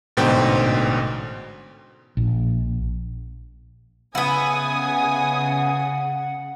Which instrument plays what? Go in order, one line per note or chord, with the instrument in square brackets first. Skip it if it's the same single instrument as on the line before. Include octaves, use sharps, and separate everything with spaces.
[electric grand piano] A1 G#2 B2 D3 C5 G5
[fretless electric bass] A#1
[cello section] C#3 [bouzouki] B3 E4 [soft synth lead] F#5 [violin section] G#5 D#6